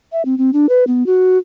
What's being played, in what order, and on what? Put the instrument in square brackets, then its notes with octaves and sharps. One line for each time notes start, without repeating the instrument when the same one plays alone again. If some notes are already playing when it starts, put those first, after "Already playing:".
[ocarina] E5
C4
C4
D4
B4
B3
F#4